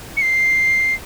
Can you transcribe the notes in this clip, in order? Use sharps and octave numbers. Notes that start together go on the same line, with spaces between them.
C#7
C7